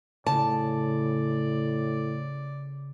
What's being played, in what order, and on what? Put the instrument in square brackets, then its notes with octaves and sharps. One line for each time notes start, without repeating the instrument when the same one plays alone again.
[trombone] A2 [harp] C#3 [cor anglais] D5 [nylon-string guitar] A5